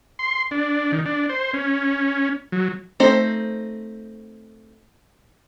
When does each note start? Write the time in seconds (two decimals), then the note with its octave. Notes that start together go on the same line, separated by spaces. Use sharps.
0.19 C6
0.51 D4
0.92 D#3
1.06 D4
1.29 C5
1.53 C#4
2.52 F#3
3.00 A3 C4 D#4 C5